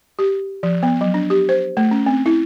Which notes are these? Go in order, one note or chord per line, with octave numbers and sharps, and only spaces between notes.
G4
F3
B3
F#3
D4
G4
C5
A3
C#4
C4
E4